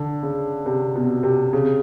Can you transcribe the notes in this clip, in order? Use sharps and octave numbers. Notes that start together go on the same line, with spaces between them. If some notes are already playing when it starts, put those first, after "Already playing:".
Already playing: D3
C#3
C3
B2
C3
C#3